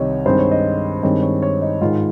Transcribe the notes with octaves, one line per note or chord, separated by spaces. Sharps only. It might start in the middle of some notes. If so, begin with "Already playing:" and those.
Already playing: C2 C3 D#3 C#5 D#5
G2 D#3 G#3 C4 C5
C#5
D#5
G2 D#3 G#3 C4 C#5
C#5
C#5
D#4
G#2 D#3 G#3 F4